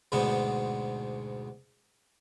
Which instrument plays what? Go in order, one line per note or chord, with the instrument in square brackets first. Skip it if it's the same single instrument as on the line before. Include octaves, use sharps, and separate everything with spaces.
[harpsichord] D2 G#2 B2 B3 D4